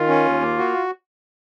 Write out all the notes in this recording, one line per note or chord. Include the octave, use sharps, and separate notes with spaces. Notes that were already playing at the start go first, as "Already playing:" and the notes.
Already playing: D#3 F4
C#4
D#2
A#3
F#4